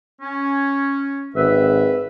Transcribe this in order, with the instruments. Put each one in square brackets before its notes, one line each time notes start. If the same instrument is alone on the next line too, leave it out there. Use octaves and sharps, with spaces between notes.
[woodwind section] C#4
[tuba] G#1 [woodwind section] B4 E5